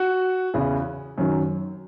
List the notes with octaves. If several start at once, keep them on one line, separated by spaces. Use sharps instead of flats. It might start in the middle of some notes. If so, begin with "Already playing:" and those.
Already playing: F#4
E2 C#3 E3
F#2 D#3 F#3